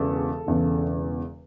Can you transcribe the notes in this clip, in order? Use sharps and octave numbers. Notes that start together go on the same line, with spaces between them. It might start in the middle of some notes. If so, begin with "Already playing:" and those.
Already playing: E1 E2 C#3 A4
E1 E2 C#3